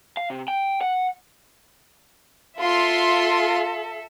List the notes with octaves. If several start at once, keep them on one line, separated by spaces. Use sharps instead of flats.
F5
C3
G5
F#5
F4 A4 E5 C6